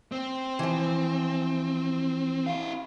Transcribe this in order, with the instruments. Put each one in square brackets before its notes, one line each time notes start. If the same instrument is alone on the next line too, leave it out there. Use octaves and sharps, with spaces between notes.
[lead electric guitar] C4
[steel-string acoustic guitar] E3 F3
[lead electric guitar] E4 F5